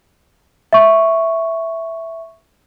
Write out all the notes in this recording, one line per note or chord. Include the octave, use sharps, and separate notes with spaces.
E5 C#6